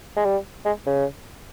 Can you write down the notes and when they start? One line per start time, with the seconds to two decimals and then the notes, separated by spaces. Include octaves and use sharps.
0.16 G#3
0.25 G3
0.65 G#3
0.86 C#3